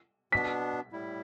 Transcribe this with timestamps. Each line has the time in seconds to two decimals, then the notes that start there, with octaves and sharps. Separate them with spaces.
0.32 B2 B3 D4 B6
0.92 A2 G3 E4